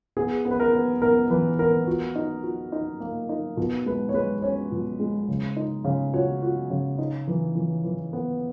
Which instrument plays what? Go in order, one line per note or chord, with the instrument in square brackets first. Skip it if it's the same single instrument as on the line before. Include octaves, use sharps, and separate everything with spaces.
[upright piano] B3 [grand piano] G#4
[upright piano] B3
[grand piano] B4
A#4
[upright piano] B3
[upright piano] B3 [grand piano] A#4
[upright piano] E3 [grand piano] B4
[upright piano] B3 [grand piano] A#4
[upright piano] F#4
D#4
F#4
D#4
A#3
D#4
B2
[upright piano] G#3 [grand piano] B4
[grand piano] C#5
[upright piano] G#3 [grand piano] B4
[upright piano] C#4 [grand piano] C#5
[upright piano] B2
G#3
C#3
D#4
C#3
[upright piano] F#4 [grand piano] C#5
[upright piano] F#4
C#3
D#4
E3
E3
E3
B3